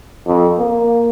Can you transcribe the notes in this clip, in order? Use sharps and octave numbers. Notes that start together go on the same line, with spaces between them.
F2
A#3